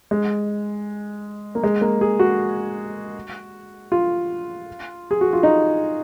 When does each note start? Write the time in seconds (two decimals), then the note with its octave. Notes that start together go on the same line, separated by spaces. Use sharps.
0.11 G#3
1.55 A#3
1.64 G#3
1.81 A#3
2.01 G#4
2.19 F#4
3.92 F4
5.11 G#4
5.21 F#4
5.33 F4
5.43 D#4